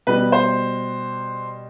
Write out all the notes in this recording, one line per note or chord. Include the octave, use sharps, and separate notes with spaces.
B2 G3 B4
C5